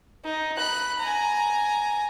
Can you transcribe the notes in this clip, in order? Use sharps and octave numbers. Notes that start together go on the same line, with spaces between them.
D#4
B5 F#6
G#5 A#5